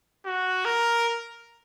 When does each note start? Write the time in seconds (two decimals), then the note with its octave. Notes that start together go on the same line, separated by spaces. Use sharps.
0.26 F#4
0.65 A#4